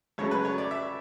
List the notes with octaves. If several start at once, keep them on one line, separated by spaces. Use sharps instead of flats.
C#2 C#3 F#3 A3 C#5
B4
C#5
D5
E5